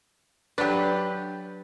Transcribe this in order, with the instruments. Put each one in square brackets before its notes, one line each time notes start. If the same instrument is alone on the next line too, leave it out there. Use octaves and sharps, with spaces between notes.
[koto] F#3 D4 [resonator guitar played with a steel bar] G4 B4